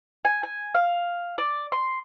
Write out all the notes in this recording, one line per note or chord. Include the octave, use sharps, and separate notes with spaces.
G#5
G#5
F5
D5
C6